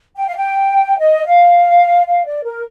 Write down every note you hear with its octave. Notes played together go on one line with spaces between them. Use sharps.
G5
F5
G5
D#5
F5
F5
D5
A#4